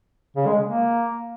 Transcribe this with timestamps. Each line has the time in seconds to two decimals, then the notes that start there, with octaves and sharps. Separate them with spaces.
0.36 C#3
0.46 G#3
0.66 A#3